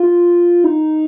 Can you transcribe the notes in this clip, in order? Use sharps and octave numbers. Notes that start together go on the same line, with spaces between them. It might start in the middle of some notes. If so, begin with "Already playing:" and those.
Already playing: F4
D#4